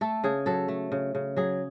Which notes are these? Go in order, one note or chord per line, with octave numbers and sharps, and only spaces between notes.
A3 A4
C#3 G#4
F#3 A4
A3
C#3
C#3
F#3 G#4